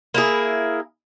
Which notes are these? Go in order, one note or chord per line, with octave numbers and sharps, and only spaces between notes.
A#3 E4 G#4